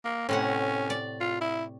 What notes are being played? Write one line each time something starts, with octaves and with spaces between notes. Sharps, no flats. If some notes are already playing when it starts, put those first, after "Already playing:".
A#3
A2 C3 C#4 F#5
D5
F4
E4